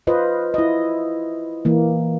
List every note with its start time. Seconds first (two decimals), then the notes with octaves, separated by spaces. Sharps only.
0.07 F4 B4 C5 D#5
0.54 E4 D#5
1.65 E3 A#3